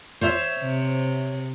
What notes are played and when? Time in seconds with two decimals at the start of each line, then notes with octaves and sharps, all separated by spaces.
0.21 C5 C#5 E5
0.60 C3